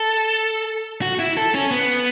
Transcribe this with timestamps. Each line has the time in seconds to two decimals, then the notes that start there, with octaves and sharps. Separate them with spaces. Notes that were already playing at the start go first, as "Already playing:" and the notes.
Already playing: A4
1.02 F#4
1.19 E4
1.37 A4
1.54 C#4
1.71 B3